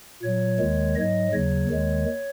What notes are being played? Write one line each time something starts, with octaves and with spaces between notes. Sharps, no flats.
A#2 F#3 C#5
D#2 D#3 G#3
G#2 F#3 D#5
D#2 C#3 F#3 C#5
D#2 D#3 G#3